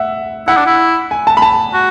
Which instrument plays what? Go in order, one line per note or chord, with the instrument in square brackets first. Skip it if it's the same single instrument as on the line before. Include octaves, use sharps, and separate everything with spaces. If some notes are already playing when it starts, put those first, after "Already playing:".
Already playing: [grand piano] E5 F#5
[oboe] E4 [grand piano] F#5
[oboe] D4
E4
[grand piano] G#5
A5
B5
A5
[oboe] F#4